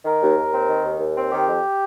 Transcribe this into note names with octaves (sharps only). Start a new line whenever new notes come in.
D#3 A#4
D#2
D#2
C4
D#3
D#2
D#2
C4
D#3 G4
F2